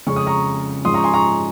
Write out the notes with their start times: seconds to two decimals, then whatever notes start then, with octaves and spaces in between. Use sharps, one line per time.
0.07 F2 C#3 G#3 C#4 C#6
0.16 D#6
0.26 A#5 C#6
0.85 G#2 F3 G#3 C#4 C6 D#6
0.94 A#5 C#6
1.04 G#5 C6
1.14 A#5 C#6